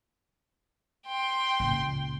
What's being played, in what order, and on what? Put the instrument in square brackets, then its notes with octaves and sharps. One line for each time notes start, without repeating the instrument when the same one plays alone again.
[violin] G5 C6
[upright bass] C#2 A#2